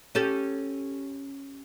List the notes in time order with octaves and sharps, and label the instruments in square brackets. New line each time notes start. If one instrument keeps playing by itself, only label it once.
[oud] C#4 G4 A4